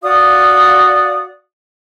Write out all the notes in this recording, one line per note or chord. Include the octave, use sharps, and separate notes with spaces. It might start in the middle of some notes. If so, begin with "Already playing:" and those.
F#4 D5 F5 D#6